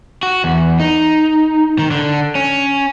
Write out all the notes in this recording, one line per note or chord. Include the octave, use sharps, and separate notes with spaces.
F#4
E2
D#4
D#3
D3
C#4